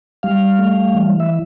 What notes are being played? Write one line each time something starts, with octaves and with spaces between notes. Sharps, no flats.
G3 F5
A3
E3
E5